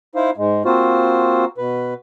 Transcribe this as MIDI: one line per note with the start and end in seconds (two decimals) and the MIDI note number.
0.15 0.30 63
0.15 0.30 64
0.15 0.30 72
0.15 0.30 77
0.37 0.63 44
0.37 0.63 56
0.65 1.45 58
0.65 1.45 60
0.65 1.45 65
0.65 1.45 66
0.65 1.45 72
1.58 1.94 47
1.58 1.94 71